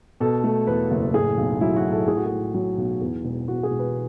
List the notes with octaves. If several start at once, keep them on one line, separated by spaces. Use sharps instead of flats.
B2 A4
A3
E2 B4
F#1
A2 G#4
B1
F#3 E4
F#4
A2
A4
A2 G#4
F#4
G#4
A2
F#3
B1
E2
E1
E2 F#4
G#4
E1
B4